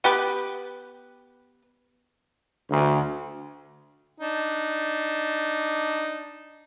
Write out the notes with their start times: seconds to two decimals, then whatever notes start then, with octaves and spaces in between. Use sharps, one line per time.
0.04 B3 G4 B4
2.70 D2
4.20 D4 D#4